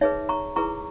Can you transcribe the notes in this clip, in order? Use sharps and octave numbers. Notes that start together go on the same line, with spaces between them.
D#4 G#4 B4 C#5 E5
A#5 C#6
E4 G#4 B4 A#5 C#6